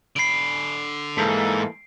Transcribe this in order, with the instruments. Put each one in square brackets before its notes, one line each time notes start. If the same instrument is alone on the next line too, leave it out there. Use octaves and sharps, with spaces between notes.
[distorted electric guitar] D3 B5 [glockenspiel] C7 D7
[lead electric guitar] G#2 [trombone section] E3 A#3 A4